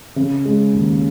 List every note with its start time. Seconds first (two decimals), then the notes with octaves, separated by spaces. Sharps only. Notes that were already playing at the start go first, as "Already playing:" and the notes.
0.16 C#3
0.45 G#3
0.74 D#2